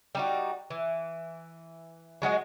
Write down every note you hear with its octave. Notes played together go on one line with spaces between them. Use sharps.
G3 D#4 F#4
E3
F#3 G#3 F#4 D#5